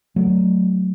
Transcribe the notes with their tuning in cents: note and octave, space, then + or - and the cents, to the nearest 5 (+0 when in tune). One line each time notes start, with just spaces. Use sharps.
F#3 +0 A3 +0